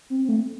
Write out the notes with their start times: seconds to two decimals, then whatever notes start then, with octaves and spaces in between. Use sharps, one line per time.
0.10 C4
0.25 C4
0.29 A3